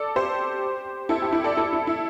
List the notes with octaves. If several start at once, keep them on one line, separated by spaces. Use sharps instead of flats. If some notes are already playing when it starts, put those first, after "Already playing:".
Already playing: A4 D5
G4 C5
E4 A4
G4
E4
A4 D5
E4 A4
E4
E4